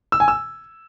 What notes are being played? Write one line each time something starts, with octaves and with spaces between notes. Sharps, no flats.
E6
G#5
E6